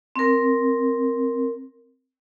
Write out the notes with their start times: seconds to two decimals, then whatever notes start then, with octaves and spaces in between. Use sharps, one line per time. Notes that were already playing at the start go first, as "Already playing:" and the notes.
0.16 C4 A#4